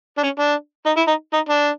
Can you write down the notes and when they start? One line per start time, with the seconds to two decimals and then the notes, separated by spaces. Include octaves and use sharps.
0.18 D4
0.23 C#4
0.39 D4
0.86 D#4
0.97 E4
1.08 D#4
1.33 D#4
1.49 D4